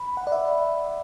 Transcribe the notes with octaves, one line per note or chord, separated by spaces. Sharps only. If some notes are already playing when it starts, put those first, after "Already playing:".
Already playing: B5
F#5
D5
E5